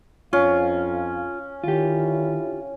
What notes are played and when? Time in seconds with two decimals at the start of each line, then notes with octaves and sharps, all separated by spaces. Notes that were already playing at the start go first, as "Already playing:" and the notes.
0.33 F2 C#4 F4 F5
1.64 D3 D#3 E4 F4 G4 C#5